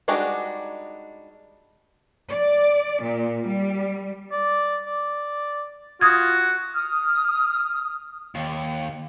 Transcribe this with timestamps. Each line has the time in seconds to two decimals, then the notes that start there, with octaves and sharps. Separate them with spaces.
0.08 G3 G#3 D4 D#4 F#4
2.28 D5
3.03 A#2
3.47 G3
4.31 D5
4.86 D5
6.01 F4 F#4 D#6 G#6
6.72 D#6 F6
8.35 D#2